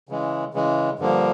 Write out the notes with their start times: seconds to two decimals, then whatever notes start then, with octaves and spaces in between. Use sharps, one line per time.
0.09 C#3 E3 G#3
0.54 C#3 E3 G#3
0.99 G2 D3 F3 A#3